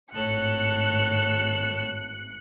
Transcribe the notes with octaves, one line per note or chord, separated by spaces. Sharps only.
G#1 A2 A4 C#5 F#6 C#7